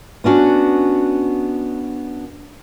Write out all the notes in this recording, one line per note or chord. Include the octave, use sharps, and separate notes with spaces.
B3 C#4 D4 F#4